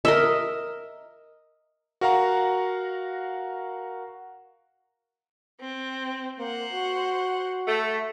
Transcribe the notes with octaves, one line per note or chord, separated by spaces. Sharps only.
A#4 D#5 E5
F#4 A#4 F5 F#5 A#5
C4
A#3 C5 F#5
F#4
A3